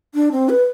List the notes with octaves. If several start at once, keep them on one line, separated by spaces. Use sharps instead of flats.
D4
C4
B4